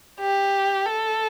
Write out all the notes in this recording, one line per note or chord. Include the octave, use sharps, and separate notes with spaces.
G4
A4